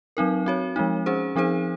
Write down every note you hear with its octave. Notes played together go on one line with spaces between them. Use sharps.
F#3 C4 D#4 A#4
C4 F#4 C#5
F3 G#3 C4 D#4
C#4 G#4 C5
F3 C4 D#4 G#4 C5